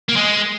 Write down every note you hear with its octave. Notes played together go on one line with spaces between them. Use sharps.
A#3
G#3